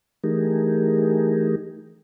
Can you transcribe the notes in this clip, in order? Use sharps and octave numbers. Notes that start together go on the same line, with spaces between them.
E3 A3 D#4 G4 G#4 A#4